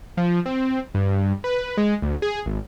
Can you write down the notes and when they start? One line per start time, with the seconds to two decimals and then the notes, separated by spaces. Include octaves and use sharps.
0.17 F3
0.46 C4
0.94 G2
1.44 B4
1.77 G#3
2.02 D2
2.22 G#4
2.46 G#1